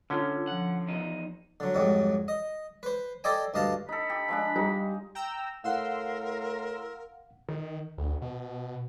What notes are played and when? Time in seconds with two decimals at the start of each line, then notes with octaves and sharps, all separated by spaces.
0.10 C2 D3 C#4 F4
0.47 F3 F#5
0.88 E2 D#4
1.60 D3 F#3
1.74 F2 G#2 F#3 G3
2.28 D#5
2.83 B4 C5
3.24 A4 C5 D5 D#5 G5 G#5
3.54 D2 G2 D#5 F5 A5
3.89 D#4 A4 B5
4.10 G4
4.29 F3 G#3 D4
4.56 G3 D#4
5.15 G5 A#5 E6
5.64 A2 A#4 F5 F#5 C6 E6
7.49 D#3
7.98 D2
8.22 B2